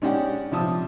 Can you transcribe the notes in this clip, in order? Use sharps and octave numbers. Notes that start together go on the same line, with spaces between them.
G#3 C#4 D4 G4 D5 F#5
C3 F3 A5 D#6